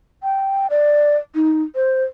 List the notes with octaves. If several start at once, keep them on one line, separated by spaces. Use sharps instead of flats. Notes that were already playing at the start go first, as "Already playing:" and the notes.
G5
D5
D#4
C5